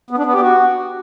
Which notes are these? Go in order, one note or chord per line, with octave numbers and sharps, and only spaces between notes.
B3
D4
B3
G4
F#4